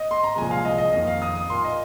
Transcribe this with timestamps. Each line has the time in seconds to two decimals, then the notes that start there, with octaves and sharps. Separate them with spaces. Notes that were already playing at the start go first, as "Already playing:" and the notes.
Already playing: D#5
0.11 C6
0.24 A#5
0.36 C2 A#2 F3 G#3 G#5
0.51 F5
0.65 D#5
0.78 D#5
0.93 F2 D#3 A#3 D#5
1.07 F5
1.22 D#6
1.35 D#6
1.50 A#2 A#3 C6
1.65 D#5